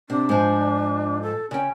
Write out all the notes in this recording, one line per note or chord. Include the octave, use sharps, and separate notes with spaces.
C3 D4
G#2 F3
A4
C#3 C#4 G5